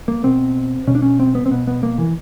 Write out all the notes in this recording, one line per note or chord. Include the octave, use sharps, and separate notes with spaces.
A#3
B2 C4
B2 C#4
D4
C#4
C4
B3
C4
B2 B3
B3
A#3
E3